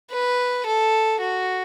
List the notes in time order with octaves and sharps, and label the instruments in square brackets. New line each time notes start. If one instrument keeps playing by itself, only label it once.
[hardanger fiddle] B4
A4
F#4